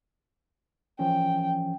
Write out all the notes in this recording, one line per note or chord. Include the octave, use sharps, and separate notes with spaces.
E3 F3 C#4 G5